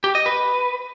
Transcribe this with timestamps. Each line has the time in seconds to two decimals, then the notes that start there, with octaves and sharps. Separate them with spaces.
0.04 G4
0.15 D#5
0.26 B4